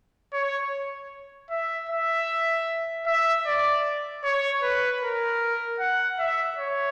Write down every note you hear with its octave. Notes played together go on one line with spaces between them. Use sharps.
C#5
E5
E5
E5
D5
C#5
B4
A#4
F#5
E5
C#5